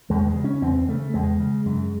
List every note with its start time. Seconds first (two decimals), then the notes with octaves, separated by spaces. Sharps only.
0.10 E2 G#3
0.27 G#3
0.36 C#3
0.44 C#4
0.62 E2 C4
0.88 C#3 A3
1.14 E2 G#3
1.40 C#3
1.66 F#2